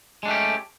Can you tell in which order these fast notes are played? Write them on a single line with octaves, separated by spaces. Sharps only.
G#3 D4 A3 G4 C#4